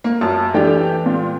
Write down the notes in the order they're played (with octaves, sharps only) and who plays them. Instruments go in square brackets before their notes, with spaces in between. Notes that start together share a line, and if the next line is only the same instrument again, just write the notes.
[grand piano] A#3
[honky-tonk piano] F#2 [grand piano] A5
[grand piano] E3 D4 G5 [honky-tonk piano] A3 G4
[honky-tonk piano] A#2